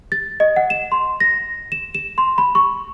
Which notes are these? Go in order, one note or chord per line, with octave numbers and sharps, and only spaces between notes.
A6
D#5
F#5
E7
C6
A#6
E7
E7
C6
B5
C#6